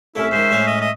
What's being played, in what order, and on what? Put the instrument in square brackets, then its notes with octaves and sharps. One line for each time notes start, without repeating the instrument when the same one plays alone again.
[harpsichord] C2 A3 [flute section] C#4 E5 [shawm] E4
[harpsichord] G#2 D#3 [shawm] C5
[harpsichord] A2 G#3 C#5
[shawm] D#5
D#5